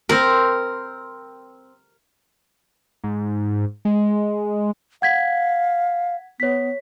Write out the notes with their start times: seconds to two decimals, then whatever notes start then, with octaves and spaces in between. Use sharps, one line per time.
0.09 C4 A#4 B5
3.04 G#2
3.85 G#3
5.02 F5 F#5 G#6 B6
6.40 B3 C#5 B6